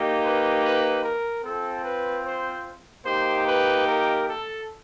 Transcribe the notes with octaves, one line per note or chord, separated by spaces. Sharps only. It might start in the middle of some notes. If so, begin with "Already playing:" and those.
Already playing: A#3 D#4 G4
B4
B4
A#4
C4 F4 A4
B4
C5
A#3 D#4 G4 C5
B4
A#4
A4